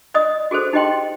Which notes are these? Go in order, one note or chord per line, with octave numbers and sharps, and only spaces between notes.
D5 D#5 D#6
F#4 G#4 A4 C5
D#4 G4 D#5 G5 C6